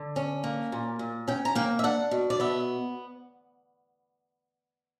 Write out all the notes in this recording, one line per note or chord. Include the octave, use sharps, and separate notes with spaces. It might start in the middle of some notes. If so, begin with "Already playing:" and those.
Already playing: D3
C#4
A#3
A#2
A#2
C#4 G5
A#5
A#3 G5
E5
D4 F#5
B2
D5
B3 E5